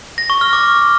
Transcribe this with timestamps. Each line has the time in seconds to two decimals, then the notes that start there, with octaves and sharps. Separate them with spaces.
0.18 A#6
0.30 C#6
0.41 F6
0.53 D6